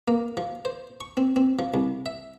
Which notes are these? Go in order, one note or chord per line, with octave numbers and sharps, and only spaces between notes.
A#3
F3
C5
C#6
C4
C4
F3
C2
E5